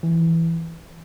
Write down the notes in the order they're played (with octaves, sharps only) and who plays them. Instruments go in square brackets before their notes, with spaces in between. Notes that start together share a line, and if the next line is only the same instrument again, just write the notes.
[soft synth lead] E3